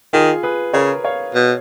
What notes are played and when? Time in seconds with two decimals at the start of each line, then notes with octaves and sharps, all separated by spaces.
0.13 D#3 F4 G#4
0.43 G#4 B4
0.74 C#3 A#4 C#5
1.05 C#5 F5
1.35 B2